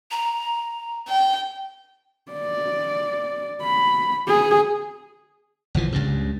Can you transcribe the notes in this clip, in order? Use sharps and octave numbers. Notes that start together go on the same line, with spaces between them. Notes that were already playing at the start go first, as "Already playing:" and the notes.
A#5
G5
D5
B5
G#4
G1 C2 E3 F3
C#2 G2 C#3